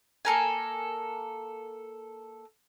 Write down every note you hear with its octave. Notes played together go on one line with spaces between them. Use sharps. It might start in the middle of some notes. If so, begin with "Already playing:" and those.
A#3 A4 A#4 G#5